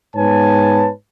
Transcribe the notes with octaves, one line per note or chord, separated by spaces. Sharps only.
G#2 B3 B4 C#5 G#5 A5